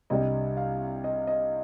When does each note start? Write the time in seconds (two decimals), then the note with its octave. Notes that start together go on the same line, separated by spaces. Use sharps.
0.10 C2 C3 G3 D4 D#5
0.57 F5
1.04 D#5
1.27 D#5